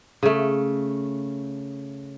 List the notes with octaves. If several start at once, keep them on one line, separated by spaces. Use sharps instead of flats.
C#3 A3